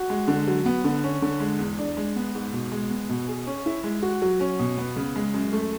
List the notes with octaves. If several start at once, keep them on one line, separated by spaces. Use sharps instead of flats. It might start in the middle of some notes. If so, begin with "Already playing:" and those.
Already playing: F#4
G#3
D3
F#3
B3
D3
C#4
D3
G#3
E2
D4
G#3
B3
G#2
B2
G#3
B3
B2
G#4
C#4
E4
G#3
F#4
F#3
C#4
B2
B3
C#3
G#3
F#2
A3